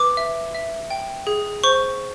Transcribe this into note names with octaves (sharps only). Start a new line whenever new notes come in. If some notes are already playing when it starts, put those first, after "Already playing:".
Already playing: B4 D6
E5
E5
G5
G#4
C5 C#6